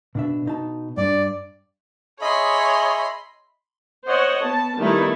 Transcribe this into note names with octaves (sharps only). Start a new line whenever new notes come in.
B2 D4 E5
B2 D#4 A5
G2 D4 D5
G#4 C#5 D#5 E5 B5 C6
C5 C#5 D#5 F#5
B3 A5
D#3 G3 A3 B3 D#4 E4